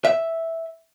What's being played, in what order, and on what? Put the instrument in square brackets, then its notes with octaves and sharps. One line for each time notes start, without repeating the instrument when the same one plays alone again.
[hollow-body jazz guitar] E5